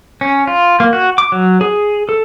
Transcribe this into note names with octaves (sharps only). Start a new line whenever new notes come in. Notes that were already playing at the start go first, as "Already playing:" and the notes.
C#4
F4
A#3
F#4
D6
F#3
G#4
A4